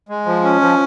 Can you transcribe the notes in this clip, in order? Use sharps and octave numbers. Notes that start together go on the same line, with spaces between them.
G#3
F3
C#4
F3